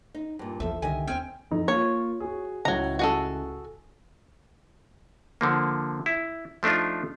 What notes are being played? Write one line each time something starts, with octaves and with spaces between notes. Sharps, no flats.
D#4
G2 A#2
A#1 E2 F3 A4 E5
C2 D3 D#3 G4 D#5 E5 G#5
D#2 C4 D4 G5 G#5 F6
F2 D#4 A4
A#3 F4 C#5
F#4 G#4
C#2 A2 F#3 A#5
F#4 G#4 A4
D3 F3 A#3
E4
F3 A3 D4 D#4 F4